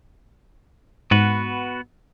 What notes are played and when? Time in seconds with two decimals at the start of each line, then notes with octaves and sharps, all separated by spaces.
1.11 G#2 B3 F#4 B4